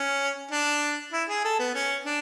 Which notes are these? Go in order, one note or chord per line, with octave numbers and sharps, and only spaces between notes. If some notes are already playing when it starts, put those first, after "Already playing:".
Already playing: C#4
D4
E4
G#4
A4
B3
C#4
D4